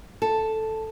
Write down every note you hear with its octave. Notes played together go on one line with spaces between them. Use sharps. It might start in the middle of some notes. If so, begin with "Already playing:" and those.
A4